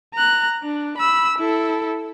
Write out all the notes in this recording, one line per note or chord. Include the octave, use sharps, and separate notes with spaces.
A#5 F#6
D4
B5 E6
E4 A4